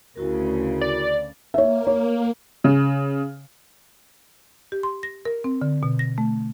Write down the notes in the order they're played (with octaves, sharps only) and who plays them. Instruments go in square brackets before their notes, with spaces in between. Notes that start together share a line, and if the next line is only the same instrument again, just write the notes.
[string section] D2 C#3 [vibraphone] E4 F#4 A#4
[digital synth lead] D5
[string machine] A#3 [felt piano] C#5 E5
[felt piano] C#5
[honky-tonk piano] C#3
[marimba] G4
C6
A#6
A#4
C4
D3
B2
A#6
A3